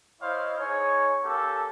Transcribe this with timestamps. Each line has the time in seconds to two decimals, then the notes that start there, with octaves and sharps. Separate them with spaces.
0.21 E4 C5 C#5 D#5 F5
0.58 D#4 G#4 C#5
1.24 A#3 C#4 G4 A4